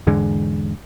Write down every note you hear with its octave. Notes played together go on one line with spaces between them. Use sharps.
E2 G#2 D3 G#3